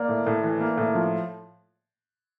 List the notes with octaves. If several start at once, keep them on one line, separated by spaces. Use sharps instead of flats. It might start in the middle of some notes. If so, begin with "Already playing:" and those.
Already playing: A#3 D5
A2
A2
E3
A#3
A2
F3